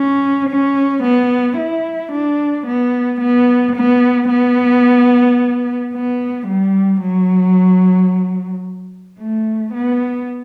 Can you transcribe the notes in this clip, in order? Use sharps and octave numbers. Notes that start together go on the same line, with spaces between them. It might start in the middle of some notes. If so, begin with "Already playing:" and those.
Already playing: C#4
C#4
B3
E4
D4
B3
B3
B3
B3
B3
G3
F#3
A3
B3